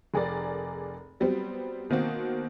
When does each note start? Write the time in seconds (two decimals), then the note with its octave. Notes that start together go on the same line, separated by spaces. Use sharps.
0.14 F1 G#4 A#4 D5
1.20 F#3 G3 B3 C4
1.90 B2 D#3 A#3 C4 F#4